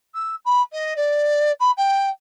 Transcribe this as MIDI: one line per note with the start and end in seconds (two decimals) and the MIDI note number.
0.15 0.36 88
0.45 0.62 83
0.73 0.94 75
0.96 1.52 74
1.60 1.71 83
1.77 2.10 79